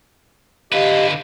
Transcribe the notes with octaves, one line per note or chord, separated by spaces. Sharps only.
D3 G4 B4 D#5 F5